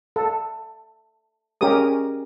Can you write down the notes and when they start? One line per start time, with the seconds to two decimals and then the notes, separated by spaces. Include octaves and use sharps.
0.16 A4
1.61 C#4 G4 G#4 A#4 D#6